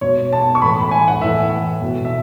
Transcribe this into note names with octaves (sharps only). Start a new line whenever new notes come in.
B2 C#5
A5
C#6
A2 E3 B5
B5
G#5
F#5
A2 E3 E5
B2
E5